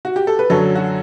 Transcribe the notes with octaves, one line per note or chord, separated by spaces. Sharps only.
F#4
G4
A4
B4
F#2 D3 F#3 A4 C#5
F#4